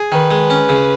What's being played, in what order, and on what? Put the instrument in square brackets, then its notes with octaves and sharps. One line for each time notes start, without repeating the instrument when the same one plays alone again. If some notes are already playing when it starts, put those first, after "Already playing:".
Already playing: [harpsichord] G#4
[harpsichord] D#3 [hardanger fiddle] B4
[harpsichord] G#3
C#4
C#3